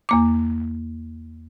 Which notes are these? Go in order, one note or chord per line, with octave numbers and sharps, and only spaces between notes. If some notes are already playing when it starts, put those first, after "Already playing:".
E2 A#3 D6